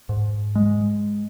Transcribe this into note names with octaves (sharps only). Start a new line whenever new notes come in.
G#2
G#3